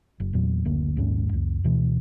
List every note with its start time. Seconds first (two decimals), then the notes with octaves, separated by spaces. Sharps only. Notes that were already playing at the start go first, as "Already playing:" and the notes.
0.20 F#1
0.33 E2 A#2 F#3
0.65 F#1 D2 A#3
0.96 A#1 D#2 G#2 C#4
1.33 C#2 F#2
1.64 D2 B2 E3